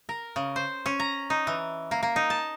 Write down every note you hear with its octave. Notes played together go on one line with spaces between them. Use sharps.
A#4
C#3
C5
C#4
A#5
D#4
E3
A#3
A#3
D#4
A5